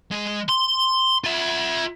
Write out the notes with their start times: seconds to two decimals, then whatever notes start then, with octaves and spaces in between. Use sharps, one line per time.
0.11 G#3
0.49 C6
1.24 F4 E5